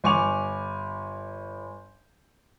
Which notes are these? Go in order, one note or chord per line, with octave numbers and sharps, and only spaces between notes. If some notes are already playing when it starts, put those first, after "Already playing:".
G1 G#5 C#6 D6 F7